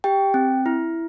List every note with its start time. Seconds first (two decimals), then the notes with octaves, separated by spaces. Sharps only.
0.04 G4 G5
0.34 C4
0.66 E4